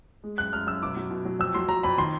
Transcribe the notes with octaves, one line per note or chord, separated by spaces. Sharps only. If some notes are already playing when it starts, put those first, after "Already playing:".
G#3
F#2 F#6
F#2 F6
F#2 E6
B2 D6
F#3
B2
F#3
F2 E6
F#3 C6
F#3 A#5
F2 B5
D#3 C6